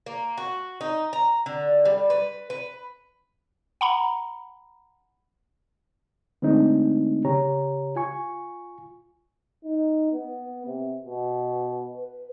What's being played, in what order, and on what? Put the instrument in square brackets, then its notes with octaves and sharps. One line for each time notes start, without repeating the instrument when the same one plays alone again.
[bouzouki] A#3
F#4
D#4
A#5
D3
G3
B4
B4
[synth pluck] F#5 A#5 B5
[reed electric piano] D3 G#3 A3 C4 D4 D#4
C#3 G4 C#5 A#5
F4 G#5 C#6
[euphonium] D#4
B3
C3
B2
B4